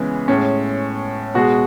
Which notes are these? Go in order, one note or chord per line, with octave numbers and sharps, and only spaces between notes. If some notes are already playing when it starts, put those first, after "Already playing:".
Already playing: C#3 E3 G#3 B3
A2 G#3 C#4
B2 G#3 F#4